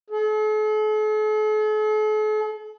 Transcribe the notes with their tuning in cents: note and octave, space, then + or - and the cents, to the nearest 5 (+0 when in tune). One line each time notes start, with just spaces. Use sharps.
A4 -45